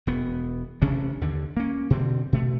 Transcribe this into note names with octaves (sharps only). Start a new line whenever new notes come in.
E1 B3
A1 C3 C#4 D4
D#2 D3
A#3 C#4
B2 D3 C4
B2 A3